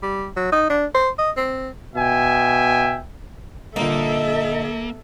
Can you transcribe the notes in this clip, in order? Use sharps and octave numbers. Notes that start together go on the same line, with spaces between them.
G3
F#3
D#4
D4
C5
D#5
C4
B2 E5 G5 G#5
G2 A#2 D3 A#3 D#4 A4 E5